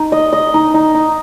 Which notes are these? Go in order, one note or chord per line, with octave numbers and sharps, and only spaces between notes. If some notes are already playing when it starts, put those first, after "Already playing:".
Already playing: D#4
D#5
D#5
D#4
D#4
D#4